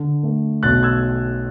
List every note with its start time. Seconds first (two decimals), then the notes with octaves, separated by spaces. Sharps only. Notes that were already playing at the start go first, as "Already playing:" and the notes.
Already playing: D3
0.23 A3
0.63 B1 F#6 A6
0.83 E6 G#6